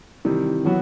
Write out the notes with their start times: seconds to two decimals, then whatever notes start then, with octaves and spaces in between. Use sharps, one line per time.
0.25 C3 D#3 E3 G3
0.64 E3 F#3 B3 F#4